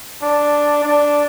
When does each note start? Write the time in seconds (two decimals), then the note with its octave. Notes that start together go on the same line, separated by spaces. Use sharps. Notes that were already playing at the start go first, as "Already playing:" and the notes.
0.22 D4
0.84 D4